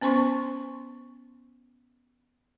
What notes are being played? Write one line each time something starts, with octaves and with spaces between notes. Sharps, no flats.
B3 C#4 C5 C6 C#6